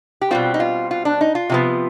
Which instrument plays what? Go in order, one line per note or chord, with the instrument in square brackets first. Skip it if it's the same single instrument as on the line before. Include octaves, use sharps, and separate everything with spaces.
[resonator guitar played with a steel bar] G4
B2 G3 C4 F4
D#4
F4
F4
D4
D#4
F4
C3 F3 B3